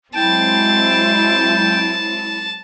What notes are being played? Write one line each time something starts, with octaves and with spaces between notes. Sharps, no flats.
F#3 G#3 C4 E4 G5 A5